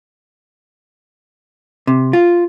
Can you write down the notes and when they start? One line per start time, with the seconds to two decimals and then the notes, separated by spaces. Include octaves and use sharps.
1.87 C3
2.13 F4